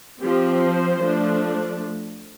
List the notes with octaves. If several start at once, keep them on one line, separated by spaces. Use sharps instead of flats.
F3 C4 G4
C5
F3 A3 D4